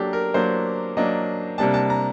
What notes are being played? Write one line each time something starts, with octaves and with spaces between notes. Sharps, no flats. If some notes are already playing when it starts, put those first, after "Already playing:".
Already playing: F#3 A#3 D4 G4 A4
A#4
F#3 A#3 D4 C5
F#3 A#3 D4 D#5
C3 G3 A#3 D4 A5
A5
A#5